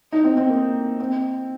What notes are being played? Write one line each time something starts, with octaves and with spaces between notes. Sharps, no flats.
D#4
C4
C4
A#3
C4